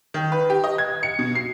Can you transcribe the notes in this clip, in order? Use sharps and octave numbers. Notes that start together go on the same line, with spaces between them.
D#3
B4
G4
D#5
G#6
C#7
B2
C7